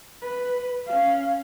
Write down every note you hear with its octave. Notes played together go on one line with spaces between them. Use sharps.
B4
C#4 F5